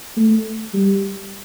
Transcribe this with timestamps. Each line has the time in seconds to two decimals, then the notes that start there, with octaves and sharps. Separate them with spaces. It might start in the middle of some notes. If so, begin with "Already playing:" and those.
0.17 A3
0.74 G3